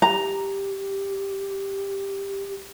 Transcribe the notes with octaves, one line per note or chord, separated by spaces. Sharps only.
G4 A#5